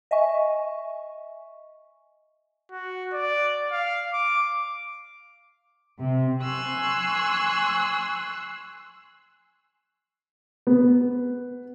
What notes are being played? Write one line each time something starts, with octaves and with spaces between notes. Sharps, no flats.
D#5 E5 G#5 C#6
F#4
D5
F5
D6
C3
G#5 C6 C#6 E6 F#6
B3